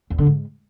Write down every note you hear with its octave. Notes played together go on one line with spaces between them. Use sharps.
E2
D3
G#2